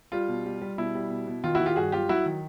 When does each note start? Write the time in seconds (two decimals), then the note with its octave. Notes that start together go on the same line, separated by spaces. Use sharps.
0.12 G3 F4
0.28 B2
0.46 G3
0.61 G3
0.78 B2 E4
0.95 G3
1.10 B2
1.27 B2
1.44 D#3 F4
1.55 E4 F#4
1.61 D#3
1.66 F4 G4
1.76 G2 F#4 G#4
1.92 F#3 F4 G4
2.09 F#3 E4 F#4
2.26 D#3